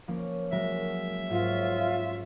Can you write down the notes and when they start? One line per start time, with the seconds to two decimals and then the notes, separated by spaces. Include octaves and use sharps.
0.08 F3 A#3 C#4
0.52 F#3 G#3 A#4 E5
1.30 G#2 C#4 F4